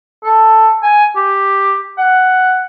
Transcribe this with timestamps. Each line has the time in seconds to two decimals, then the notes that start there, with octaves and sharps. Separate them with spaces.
0.24 A4
0.83 G#5
1.16 G4
1.98 F#5